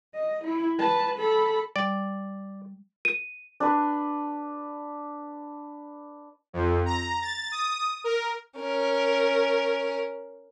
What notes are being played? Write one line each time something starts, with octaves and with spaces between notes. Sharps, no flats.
D#5
E4
B4 A5
A4 B5
G3 D5
D#7
D4 B4
F2
A#5
A6
D#6
A#4
C#4 A#4